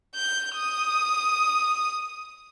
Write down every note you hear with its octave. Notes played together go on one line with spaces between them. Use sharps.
G6
D#6